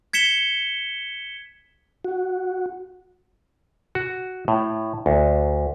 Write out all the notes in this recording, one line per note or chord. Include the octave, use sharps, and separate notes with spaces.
G#6 B6 C#7 E7 G7
F#4
F#4
A2
D2